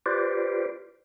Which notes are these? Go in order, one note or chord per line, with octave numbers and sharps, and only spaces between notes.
F4 G4 B4 C5 D5